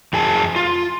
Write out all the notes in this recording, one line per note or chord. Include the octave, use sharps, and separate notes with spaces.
F2 G#4 A5
F4